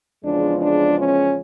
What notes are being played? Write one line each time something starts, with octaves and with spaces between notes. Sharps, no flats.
E2 C#3 F3 G#3 D4
D4
C#4